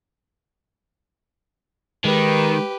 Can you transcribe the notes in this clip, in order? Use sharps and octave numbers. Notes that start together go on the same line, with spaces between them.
D#3 G#3 G4 B4